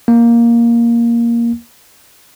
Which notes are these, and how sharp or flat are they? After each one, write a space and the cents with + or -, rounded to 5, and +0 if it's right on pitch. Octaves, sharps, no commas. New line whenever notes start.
A#3 +5